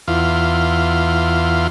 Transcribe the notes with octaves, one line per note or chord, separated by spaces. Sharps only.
E2 F4